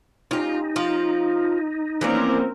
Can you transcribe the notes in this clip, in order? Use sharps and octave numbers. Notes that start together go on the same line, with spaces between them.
C#4 D#4 F4 G4
F3 F4
E3 F3 A#3 C4 C#4 A#4 D5